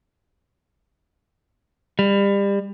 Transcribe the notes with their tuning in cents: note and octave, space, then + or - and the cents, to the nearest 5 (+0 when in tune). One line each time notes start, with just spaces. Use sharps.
G3 +30